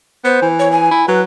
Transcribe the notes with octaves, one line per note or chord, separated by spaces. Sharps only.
B3 C5
E3
C#5
G#5
E4
F#3 B4